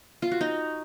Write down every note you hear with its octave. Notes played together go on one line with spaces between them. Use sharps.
F4
F#4
D#4